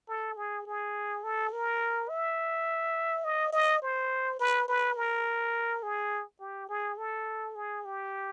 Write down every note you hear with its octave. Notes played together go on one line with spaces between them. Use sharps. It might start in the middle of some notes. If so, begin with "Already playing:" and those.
A4
G#4
G#4
A4
A#4
E5
D#5
D#5
C5
B4
B4
A#4
G#4
G4
G#4
A4
G#4
G4